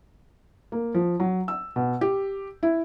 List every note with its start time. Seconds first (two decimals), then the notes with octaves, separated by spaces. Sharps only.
0.72 A#3
0.94 F3
1.20 F#3
1.48 E6
1.76 B2
2.01 G4
2.63 E4